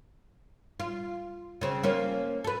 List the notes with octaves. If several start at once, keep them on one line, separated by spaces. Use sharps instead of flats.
F4
C#3 C4
A#3 C#4 F4
A4 B4